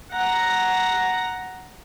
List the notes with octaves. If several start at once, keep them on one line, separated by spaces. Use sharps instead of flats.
F#5 A#5